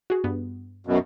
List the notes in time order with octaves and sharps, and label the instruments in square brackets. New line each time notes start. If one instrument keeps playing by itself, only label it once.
[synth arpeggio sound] F#4 G#4
G2 B3
[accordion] F#2 B2